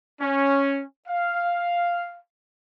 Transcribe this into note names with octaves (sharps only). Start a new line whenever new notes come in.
C#4
F5